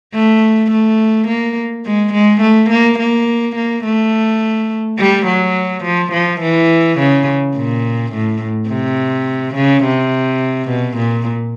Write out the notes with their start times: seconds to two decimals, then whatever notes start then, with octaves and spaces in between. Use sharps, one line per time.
0.14 A3
0.71 A3
1.28 A#3
1.85 G#3
2.14 G#3
2.41 A3
2.70 A#3
2.99 A#3
3.56 A#3
3.84 A3
4.99 G3
5.27 F#3
5.84 F3
6.13 F3
6.41 E3
6.99 C#3
7.56 A#2
8.13 A2
8.69 C3
9.55 C#3
9.84 C3
10.69 B2
10.97 A#2